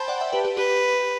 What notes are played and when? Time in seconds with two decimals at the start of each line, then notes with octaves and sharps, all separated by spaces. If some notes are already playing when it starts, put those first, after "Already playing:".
Already playing: C5 G5 A5 B5
0.08 D5 F#5
0.20 E5 G5
0.33 G4 B4
0.45 G4
0.57 G4 B4